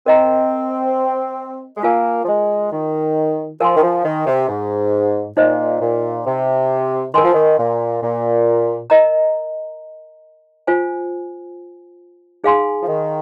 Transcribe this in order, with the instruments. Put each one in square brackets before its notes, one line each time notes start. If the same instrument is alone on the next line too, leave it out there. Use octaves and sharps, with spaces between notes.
[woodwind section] C4 [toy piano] A#4 D#5 A#5
[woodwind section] G#3
[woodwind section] A#3 [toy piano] F4 A#4 G#5
[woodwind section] F3
G#3
D#3
[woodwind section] F3 [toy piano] A#4 G#5 C6
[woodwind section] D#3
F3
D#3
C3
G#2
[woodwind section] A#2 [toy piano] D#4 C5 D#5
[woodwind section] A#2
C3
[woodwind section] D#3 [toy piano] A#4 G#5 C6
[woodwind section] F3
D#3
A#2
A#2
[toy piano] A#4 D#5 A#5
F4 C5 G#5
D#4 G#4 F5 G#5 C6
[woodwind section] F3
D#3